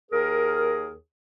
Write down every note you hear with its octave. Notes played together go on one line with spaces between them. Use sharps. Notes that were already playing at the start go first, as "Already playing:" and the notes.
D#2 G#4 A#4